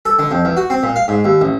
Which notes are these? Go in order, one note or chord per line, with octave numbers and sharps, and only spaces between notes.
A4
D3
F2
E2
F#4
C4
A#2
F5
G#2
D#2
A1